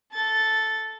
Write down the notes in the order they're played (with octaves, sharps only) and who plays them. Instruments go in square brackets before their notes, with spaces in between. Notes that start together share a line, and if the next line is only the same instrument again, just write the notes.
[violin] A4 A6